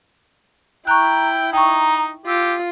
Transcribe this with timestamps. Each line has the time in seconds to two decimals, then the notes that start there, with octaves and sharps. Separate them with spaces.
0.87 E4 G5 A#5 C#6 F#6
1.53 D#4 G5 A#5 C#6
2.26 F4 G4 E6